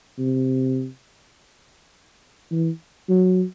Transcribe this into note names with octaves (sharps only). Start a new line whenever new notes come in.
C3
E3
F#3